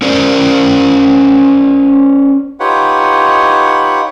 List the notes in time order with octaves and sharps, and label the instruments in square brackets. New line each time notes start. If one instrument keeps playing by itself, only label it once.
[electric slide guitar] C#4 A#4 C5 D5
[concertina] D#4 F4 G4 B4 C#5 F#5